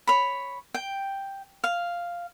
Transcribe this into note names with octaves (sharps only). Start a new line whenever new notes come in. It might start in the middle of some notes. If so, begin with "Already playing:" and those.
C#5 B5
G5
F5